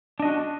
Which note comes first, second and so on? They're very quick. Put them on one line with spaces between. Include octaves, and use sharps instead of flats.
D4 D#5 F#4